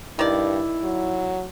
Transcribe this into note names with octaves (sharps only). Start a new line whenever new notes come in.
G2 D#3 E4 D5
F#3